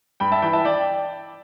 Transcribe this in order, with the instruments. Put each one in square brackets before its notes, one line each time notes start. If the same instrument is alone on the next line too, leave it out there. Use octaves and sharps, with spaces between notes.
[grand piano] G2 G5 B5
E5 A5
E3 G5 B5
E5 A5
D5 G5